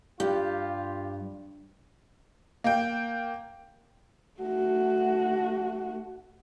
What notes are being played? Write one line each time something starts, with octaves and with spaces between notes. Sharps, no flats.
G2 F4 G4
A#3 G5
A3 F#4